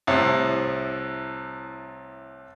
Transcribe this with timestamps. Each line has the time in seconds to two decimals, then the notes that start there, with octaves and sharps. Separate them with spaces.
0.07 C2 A2